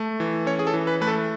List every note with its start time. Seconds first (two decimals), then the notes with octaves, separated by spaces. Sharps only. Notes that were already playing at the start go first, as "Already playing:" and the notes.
Already playing: A3
0.20 E3
0.46 C#4 C#5
0.59 G#4
0.67 A4
0.74 E3
0.87 B4
1.01 A3 B4
1.07 A4